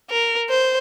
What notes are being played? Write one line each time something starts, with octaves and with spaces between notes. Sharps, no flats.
A#4
C5